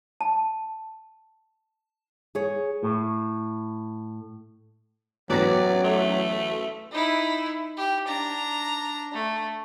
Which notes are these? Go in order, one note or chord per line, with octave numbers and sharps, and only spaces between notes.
A5
G#4 C#5
A2
A1 E2 F#3 C#4 F#4 B4 D5 A#6
A3
D#4 E4
G4
D4 A#5
A3